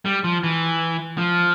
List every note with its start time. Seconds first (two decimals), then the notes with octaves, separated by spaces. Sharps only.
0.05 G3
0.24 F3
0.44 E3
1.18 F3